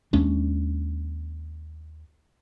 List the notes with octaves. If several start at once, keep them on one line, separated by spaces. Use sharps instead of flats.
D#2 G#3 C#4 D4